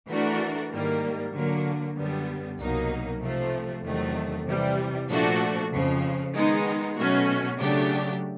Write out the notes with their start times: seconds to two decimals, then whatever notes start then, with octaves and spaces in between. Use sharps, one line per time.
0.08 E3 A3 D4 F#4 A#4
0.70 G#2 D#3 G3 A#3
1.33 D3 F#3 A#3
1.95 F#2 D3 G3 B3
2.59 C2 B2 F#3 A#3 D#4
3.21 C3 F3 A3
3.83 E2 C3 D#3 F#3 A3
4.46 C3 E3 G3
5.08 A#2 F3 A3 D4 F#4
5.71 F2 C#3 F3
6.34 D#3 G#3 B3 D#4
6.96 B2 F#3 A3 C#4 F#4
7.59 C#3 F#3 A3 D4 G4